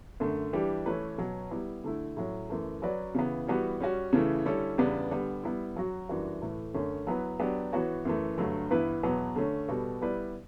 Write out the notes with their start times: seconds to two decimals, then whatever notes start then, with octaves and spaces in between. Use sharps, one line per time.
0.20 F#2 D3 A3
0.53 E3 G3 D4 G4
0.86 E3 A3 C#4 E4 B4
1.18 B2 F#3 C#4
1.51 G3 B3 E4
1.84 D3 A3 E4
2.17 A2 F#3 C#4
2.49 F#2 E3 A3
2.82 F#3 C#4 F#4 B4 D5
3.15 C#3 E3 B3
3.47 E3 G3 B3 F#4
3.80 G3 C#4 F#4
4.13 C#3 E3 A3 E4
4.45 D3 G3 C#4 E4 A4
4.78 E2 C#3 G3 B3 D4
5.11 D3 G3 B3
5.43 G3 B3 E4
5.76 F#3 C#4 F#4
6.09 F#2 E3 G3 D4 F#4
6.41 A2 E3 A3
6.74 F#2 D3 A3 C#4
7.07 F#3 B3 E4 B4
7.40 F#3 B3 D4 G4
7.72 E3 B3 F#4 C#5
8.05 F#2 E3 A3
8.38 G2 D3 F#3 A3
8.70 G2 E3 B3 E4 B4
9.03 E2 B2 F#3 B3
9.36 D3 A3 C#4
9.68 B2 G3 B3 F#4 A4
10.01 G3 B3 E4 B4 D5